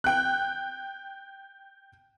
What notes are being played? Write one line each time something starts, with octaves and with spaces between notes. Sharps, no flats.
G5 F#6